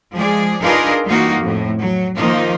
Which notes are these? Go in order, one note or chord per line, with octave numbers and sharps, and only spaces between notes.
F3 G#3 G#4 D5
D4 D#4 F4 G#4 A#4 B4
E3 G3 A#3 D#4 F4 F#4
F2 A2
F#3
D#3 F3 A#3 D#4 F4